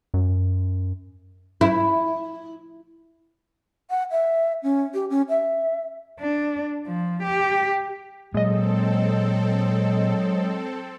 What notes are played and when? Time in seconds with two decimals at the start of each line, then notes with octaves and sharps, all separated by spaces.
0.14 F#2
1.61 E4
3.90 F#5
4.11 E5
4.63 C#4
4.94 G4
5.10 C#4
5.29 E5
6.19 D4
6.87 F3
7.23 G4
8.34 A#2 F#3 G#3 C4 A4 D#5